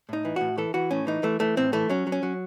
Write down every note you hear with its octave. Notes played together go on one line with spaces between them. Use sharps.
A2 D#4
E3
A2 F#4
E3 A4
E3 F#4
A2 C#4
E3 D#4
E3 A3
E3 A3
A2 C4
E3 A3
F#3 C#4
F#3
C#4
F#3